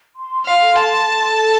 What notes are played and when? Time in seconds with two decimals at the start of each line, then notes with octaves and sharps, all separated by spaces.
0.16 C6
0.45 F5
0.60 A4
0.75 A5
1.05 A4